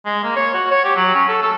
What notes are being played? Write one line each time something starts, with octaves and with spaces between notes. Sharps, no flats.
G#3
A#3
C#5
F#4
C#5
G4
F#3
C#4
A4
A4